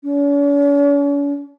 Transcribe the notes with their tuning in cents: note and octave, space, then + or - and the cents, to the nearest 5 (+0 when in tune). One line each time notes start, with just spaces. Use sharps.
C#4 +45